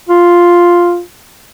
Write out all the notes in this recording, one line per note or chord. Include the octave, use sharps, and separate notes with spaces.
F4